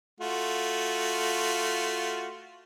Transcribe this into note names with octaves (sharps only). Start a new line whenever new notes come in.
A3 F4 F#4